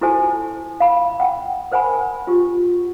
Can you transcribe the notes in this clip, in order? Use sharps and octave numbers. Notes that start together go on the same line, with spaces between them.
E4 F#4 A4 C5 G#5 A5
F5 B5
F#5 G5
A#4 C5 F#5 G#5 B5
F4 G4